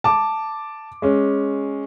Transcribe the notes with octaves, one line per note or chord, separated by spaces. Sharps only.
A5 D6
G#3 C#4